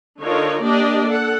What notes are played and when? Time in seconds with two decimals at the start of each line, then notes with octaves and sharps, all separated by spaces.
0.20 D3 D#4 F4 A#4 C#5
0.63 A#3 D4 G4 D5 D#5
1.06 A4 F#5